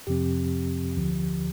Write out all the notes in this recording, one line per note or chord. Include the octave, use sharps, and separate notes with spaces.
F2 C3 F3 C4 G4
D2 D3 F3